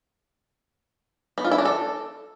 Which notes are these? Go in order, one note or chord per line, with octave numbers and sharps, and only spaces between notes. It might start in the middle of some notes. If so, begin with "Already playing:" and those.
B3
F4
E4
D4
A4